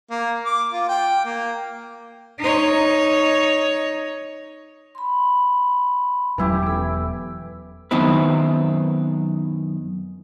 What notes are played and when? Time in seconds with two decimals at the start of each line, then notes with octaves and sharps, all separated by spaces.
0.10 A#3
0.45 D6
0.72 F4
0.89 G5
1.25 A#3
2.39 D#4 C#5
4.95 B5 C6
6.38 E1 E3 F#3 C#4 E4 G4
6.63 B3 A4
7.91 F#2 D#3 B3 C4 E4 B4